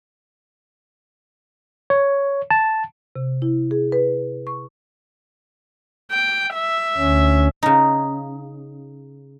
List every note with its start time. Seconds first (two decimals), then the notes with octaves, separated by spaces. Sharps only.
1.90 C#5
2.50 A5
3.16 C3
3.42 E4
3.71 G#4
3.92 B4
4.47 C#6
6.12 G5
6.55 E5
6.97 D2 C#4
7.63 C#3 D#4